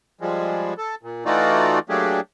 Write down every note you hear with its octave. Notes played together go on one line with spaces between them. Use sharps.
F3 G3 G#3
A4
A#2
E3 A3 D#4 F4 F#4 D5
F#3 A3 A#3 D4 G4 G#4